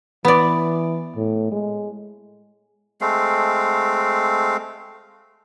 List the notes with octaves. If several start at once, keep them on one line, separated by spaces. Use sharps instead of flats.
E3 B3 D5
A2
G#3
G#3 A3 C4 F5